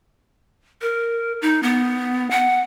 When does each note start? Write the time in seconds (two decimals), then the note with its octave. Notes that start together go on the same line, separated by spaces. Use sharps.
0.82 A#4
1.42 D#4
1.63 B3
2.31 F#5